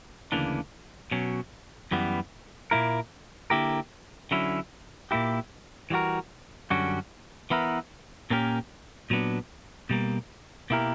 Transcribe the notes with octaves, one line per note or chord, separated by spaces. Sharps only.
D2 C#3 E3 A#3 D4
B2 F#3 C#4
F#2 E3 G3 B3
A#2 A#3 E4 A#4
D3 A#3 E4 G4 A#4
D3 F#3 C#4 E4
A#2 A#3 E4 G4
E3 G3 B3 F#4 A#4
F#2 D3 G3 C#4 F#4
E3 B3 E4 A#4
A#2 A#3 C#4 G4 A#4
A#2 F#3 B3 D4
B2 G3 A#3
B2 A#3 E4 G4 A#4